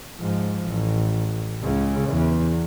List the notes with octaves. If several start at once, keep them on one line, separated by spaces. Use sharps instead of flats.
G#2 F3
A1
C#2 C#3
E2